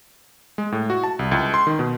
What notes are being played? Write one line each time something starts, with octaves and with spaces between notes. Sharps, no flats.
G#3
A2
F#4
A5
C2
C#2
C6
D#3
B2